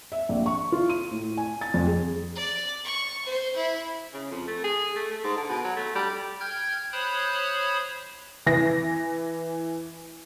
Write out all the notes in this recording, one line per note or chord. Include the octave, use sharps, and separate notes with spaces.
E5
A#1
C#6
F4
D#7
A2
G#5
A6
F2
G#4
D5
C#6
C5
E4
C#3
F2
A3
G#4
A3
A3
G#2
D3
B2
F#3
A3
G3
G5 F6 G6 G#6
C5 C#5 B5 D#6 F#6
E3 A#6